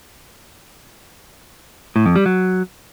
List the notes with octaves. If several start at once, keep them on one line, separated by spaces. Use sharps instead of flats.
A2
F2
G3
F#3